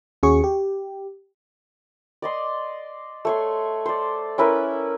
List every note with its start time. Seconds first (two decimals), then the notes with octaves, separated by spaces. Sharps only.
0.23 D#2 C#4 F#4 G#4 C#6
0.44 G4
2.22 D5 D#5 C6
3.25 A3 C#5 C6
3.86 C5 D5
4.38 C#4 E4 A#4 B4